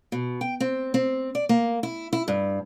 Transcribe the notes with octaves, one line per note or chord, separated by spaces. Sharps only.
B2
G5
C4
C4
D5
A#3
E4
E4
G2